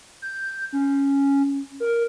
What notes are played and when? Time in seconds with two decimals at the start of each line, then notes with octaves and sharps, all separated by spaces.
0.22 G6
0.73 C#4
1.80 A#4